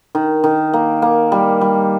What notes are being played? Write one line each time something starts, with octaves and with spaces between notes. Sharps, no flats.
D#3
D#3
A#3
A#3
G3
G3